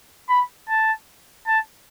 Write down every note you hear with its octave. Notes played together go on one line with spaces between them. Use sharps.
B5
A5
A5